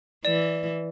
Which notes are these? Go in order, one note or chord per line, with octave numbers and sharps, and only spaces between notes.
E3 D5 E7